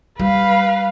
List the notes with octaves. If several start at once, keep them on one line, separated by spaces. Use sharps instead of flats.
G3 B4 F5